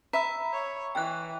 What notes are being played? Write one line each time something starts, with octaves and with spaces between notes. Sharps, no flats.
E5 A#5 B5 E6
C#5
E3 G5 F#6